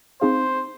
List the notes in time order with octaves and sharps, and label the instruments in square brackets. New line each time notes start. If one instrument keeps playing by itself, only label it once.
[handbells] C4 D#4 G#4 F5 [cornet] C5